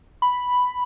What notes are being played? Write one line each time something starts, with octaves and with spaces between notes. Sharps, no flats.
B5